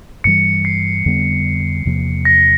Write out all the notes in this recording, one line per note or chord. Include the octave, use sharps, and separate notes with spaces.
G2 E3 G3 C#7
C7
F2 D3 G3 B3
E2 C3 F3 A#3
A#6